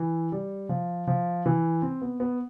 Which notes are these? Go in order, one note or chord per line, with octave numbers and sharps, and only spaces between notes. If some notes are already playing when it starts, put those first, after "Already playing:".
Already playing: E3
G3
F3
F3
E3
C4
B3
B3